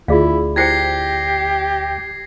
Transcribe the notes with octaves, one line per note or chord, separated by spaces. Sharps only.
D2 E4 F4 G#4 D5 F5
E4 G4 C5 G5 G#6 A#6 C7